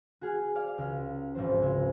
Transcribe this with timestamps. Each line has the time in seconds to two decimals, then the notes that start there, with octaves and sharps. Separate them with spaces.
0.21 F#4 G#4 F6 G#6
0.55 D5 F5
0.78 C#2 F6
1.35 G#1 C#2 F3 C5
1.62 C#2